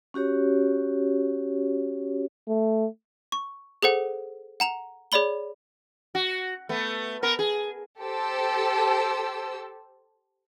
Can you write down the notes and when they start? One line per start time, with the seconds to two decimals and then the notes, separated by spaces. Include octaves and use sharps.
0.14 C#4 F#4 G4 C#5
2.48 A3
3.32 C#6
3.82 G#4 A4 C5 F#5
4.60 F#5 A#5 F7
5.12 G#4 C#5 D5 B5 G7
6.15 F#4
6.69 A3 B3
7.23 B3 A#4
7.39 G#4
8.01 G4 A4 C5 A5 E6